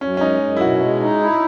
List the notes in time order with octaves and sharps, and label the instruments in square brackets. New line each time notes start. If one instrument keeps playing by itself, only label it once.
[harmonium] F#2 [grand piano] C#4
[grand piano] C#4
[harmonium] G#3 [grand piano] D#4
[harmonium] F#2
[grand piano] E4
[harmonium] B2 [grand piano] F#4
[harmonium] G#3
D#4
E4